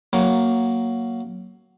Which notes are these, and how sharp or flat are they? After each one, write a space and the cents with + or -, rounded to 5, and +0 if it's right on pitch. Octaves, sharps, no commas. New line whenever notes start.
F#3 +5 A#3 +0